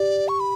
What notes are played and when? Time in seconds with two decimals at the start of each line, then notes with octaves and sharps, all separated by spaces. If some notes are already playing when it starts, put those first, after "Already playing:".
Already playing: G4 D5
0.28 C#6
0.40 B5